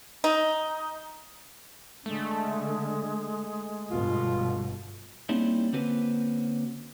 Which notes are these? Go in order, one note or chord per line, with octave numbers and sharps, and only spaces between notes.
D#4
D3 G#3 A3
G1 B2 F4
G3 A#3 C4 C#4 D#4 E4
D3 A#3 C4 C#4 F#4 B4